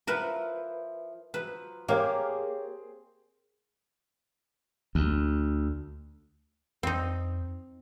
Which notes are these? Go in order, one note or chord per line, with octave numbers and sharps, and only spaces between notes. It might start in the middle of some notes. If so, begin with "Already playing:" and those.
F3 E4 A#4 B4 F#5
F3 F#3 B4
A#3 C4 G4 G#4 C#5 F5
D2
F2 C4 D#4